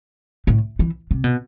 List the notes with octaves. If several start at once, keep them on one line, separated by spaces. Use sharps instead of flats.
A2
E3
C3
B2